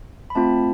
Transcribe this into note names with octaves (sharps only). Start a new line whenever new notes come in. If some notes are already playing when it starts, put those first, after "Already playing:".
B5
A3 C4 F4 A5